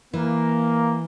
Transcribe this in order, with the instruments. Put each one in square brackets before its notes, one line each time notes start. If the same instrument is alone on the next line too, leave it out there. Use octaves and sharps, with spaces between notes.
[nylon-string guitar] E3 [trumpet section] A#3